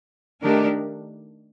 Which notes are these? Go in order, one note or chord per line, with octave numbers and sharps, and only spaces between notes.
D#3 A3 D4 G4 A#4